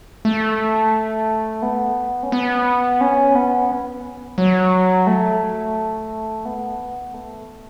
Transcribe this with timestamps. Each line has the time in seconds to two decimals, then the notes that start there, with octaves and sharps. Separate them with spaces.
0.25 A3
1.62 B3
2.23 C#4
2.32 B3
3.01 C#4
3.35 B3
4.38 F#3
5.07 A3
6.45 B3
7.14 A3